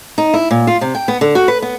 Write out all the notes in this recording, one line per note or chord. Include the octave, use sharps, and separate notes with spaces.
D#4
E4
A#2
F4
C3
G5
B3
D3
F#4
B4
B3